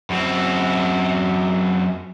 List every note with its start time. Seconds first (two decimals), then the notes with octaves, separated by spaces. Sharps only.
0.10 F#2 C4